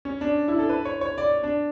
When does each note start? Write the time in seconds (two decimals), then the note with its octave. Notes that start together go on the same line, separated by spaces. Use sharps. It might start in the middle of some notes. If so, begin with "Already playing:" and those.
0.05 C#4
0.21 D4
0.48 E4
0.59 A4
0.69 B4
0.85 C#5
1.01 C#5
1.18 D5
1.43 D4